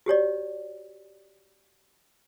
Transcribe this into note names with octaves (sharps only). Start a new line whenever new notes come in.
F#4 G4 C#5 D5